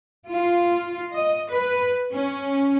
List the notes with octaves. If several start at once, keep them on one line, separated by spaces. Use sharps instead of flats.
F4
D#5
B4
C#4